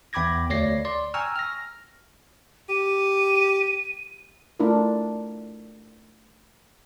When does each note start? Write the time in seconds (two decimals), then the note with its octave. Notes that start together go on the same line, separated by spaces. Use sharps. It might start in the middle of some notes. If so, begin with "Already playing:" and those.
0.13 E2 G5 B5 D6 G#6 A#6
0.50 D2 C#5 D5 A#6 C7
0.85 D5 C6
1.14 G5 G#5 A#5 C#6 E6 F6
1.36 F6 A#6
2.69 G4 D#7
4.60 A3 D4 E4 F4 A#4